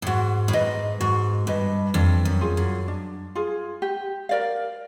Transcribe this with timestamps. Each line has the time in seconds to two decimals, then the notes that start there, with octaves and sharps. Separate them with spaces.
0.02 A2
0.07 G#2 F#4
0.48 A2
0.53 G#2 B4 D#5
1.00 G#2 F#4
1.47 G2 B4 D#5
1.94 F2 D4
2.25 F#2
2.41 F4 G#4
2.57 F#2
2.88 D4
3.35 F4 G#4
3.82 G4
4.29 A#4 D5 F5